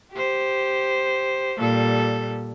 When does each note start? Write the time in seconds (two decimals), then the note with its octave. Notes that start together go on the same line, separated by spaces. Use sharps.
0.12 G4 C5
1.57 A#2 G3 A4